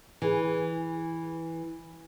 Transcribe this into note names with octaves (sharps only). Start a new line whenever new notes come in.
E3 G#4